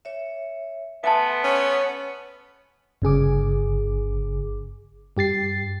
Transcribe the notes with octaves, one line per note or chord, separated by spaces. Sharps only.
C#5 E5
A3 B3 E5 G#5 A5 C6
C#4
C#5
G1 C#3 G#4 D6
G2 G4 A6 C7